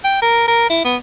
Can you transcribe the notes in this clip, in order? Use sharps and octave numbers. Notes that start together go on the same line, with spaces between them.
G5
A#4
A#4
E4
B3